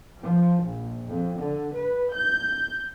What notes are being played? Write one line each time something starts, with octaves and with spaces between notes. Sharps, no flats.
F3
A#1
F2
D3
B4
G6